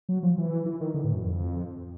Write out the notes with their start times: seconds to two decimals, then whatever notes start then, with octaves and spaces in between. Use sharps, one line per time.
0.09 F#3
0.23 F3
0.38 E3
0.66 E3
0.81 D#3
0.94 D3
1.04 A2
1.14 F#2
1.22 F2